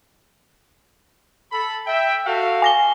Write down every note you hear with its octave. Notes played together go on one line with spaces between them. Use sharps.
A4 B5
E5 G5
F#4 A4 F5
G#5 A#6 G7